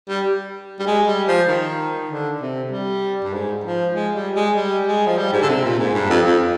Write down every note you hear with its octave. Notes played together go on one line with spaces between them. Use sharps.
G3
G3
G#3
G3
F3
D#3
D3
C3
G3
G2
G#2
F3
G#3
G3
G#3
G3
G#3
F3
G3
G#2
D3
C3
A#2
G#2
G2
F2
F2